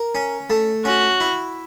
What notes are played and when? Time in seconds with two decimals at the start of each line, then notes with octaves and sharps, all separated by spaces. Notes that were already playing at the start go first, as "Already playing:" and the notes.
Already playing: A#4
0.15 C#4
0.50 A3
0.85 C#4 F#4
1.20 E4